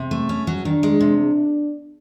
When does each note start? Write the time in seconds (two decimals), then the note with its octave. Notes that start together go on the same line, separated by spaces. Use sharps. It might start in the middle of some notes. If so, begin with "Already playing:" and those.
Already playing: C3
0.11 A3
0.29 C#4
0.47 F#3
0.65 D#3 D4
0.83 G#3
1.00 C3